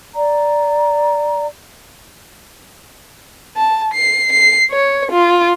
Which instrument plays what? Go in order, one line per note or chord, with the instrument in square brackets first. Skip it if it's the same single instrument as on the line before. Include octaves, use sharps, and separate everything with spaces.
[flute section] D5 A#5
[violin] A5
C7
C7
C#5
F4